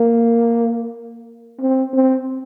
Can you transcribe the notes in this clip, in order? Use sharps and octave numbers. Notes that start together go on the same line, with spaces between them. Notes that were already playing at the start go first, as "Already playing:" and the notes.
Already playing: A#3
C4
C4